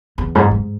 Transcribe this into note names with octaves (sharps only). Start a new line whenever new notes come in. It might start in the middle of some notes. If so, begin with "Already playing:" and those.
E2
G#2
G#2